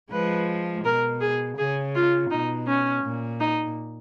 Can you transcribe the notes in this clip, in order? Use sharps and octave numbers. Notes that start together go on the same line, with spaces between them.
F3 G#3 B4
B2 A#4
G#4
C#3 G#4
F4
B2 D#4
C#4
A#2
D#4